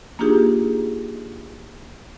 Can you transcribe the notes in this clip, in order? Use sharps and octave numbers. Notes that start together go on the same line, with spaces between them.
A#3 D4 D#4 F4 G4 G#4